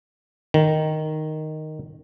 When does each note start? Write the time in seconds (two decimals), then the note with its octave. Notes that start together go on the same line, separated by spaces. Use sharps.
0.54 D#3